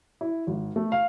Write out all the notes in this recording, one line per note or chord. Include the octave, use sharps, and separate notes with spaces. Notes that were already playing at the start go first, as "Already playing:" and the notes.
E4
G#1
A3
F5